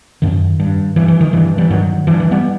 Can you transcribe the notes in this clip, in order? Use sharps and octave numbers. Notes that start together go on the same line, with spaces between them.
F#2 D#3
G2
G2 E3
E3
D#3
G2 E3
E3 G3
G2 D#3 F#3
G2 E3
E3
G3 B3